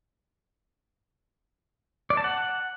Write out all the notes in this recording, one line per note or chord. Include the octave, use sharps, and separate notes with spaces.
D5
A5
F#5